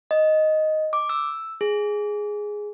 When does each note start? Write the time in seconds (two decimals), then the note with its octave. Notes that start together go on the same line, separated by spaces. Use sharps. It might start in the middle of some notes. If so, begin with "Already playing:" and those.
0.11 D#5
0.93 D6
1.09 E6
1.61 G#4